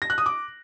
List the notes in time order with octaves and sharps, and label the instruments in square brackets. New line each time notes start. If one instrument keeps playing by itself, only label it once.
[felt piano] A#6
F#6
D#6
D6